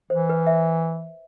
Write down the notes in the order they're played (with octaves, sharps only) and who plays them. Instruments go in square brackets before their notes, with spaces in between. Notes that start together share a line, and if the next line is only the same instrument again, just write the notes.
[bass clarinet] E3 [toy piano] C5
[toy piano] B4
E5